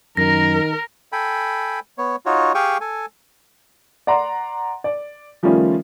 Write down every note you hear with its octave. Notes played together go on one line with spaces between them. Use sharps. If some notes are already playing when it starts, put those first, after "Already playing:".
F#2 D#3 A#4 A#6
A4 G5 G#5 B5
B3 C#5
D#4 F4 F#4 C#5
G4 G#4 F5 G5 C#6 D#6
A4 G#5
D5 F#5 A#5 C6
D5
D#3 F3 G3 A3 C#4 F4